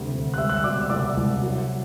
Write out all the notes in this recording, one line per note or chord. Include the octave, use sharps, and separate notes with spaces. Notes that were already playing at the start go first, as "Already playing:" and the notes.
Already playing: D2 C3 G3
D2
F#6
G3 E5 E6
F#6
E6
B2 D5 D6
E6
C2 D5 D6
C2
F#3